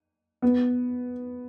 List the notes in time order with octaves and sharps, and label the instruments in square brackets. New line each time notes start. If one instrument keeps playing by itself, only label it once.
[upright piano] B3